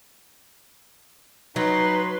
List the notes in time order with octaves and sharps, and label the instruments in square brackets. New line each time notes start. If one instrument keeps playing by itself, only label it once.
[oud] F#3 [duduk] D#4 [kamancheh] B4 C6